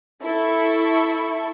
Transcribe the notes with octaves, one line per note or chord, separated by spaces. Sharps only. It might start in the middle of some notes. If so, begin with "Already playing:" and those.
E4 A4 C#6